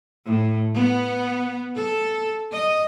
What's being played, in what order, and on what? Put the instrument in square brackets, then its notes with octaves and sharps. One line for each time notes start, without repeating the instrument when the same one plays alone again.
[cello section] A2
B3
A4
D#5